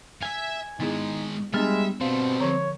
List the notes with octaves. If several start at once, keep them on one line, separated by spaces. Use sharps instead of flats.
E5 F5 G#5
D#3 G#3 B3 D#4 E4 G#4
G3 G#3 B3 D4 E5 F6
B2 G3 C4 A4 F5
D3 F3 C#5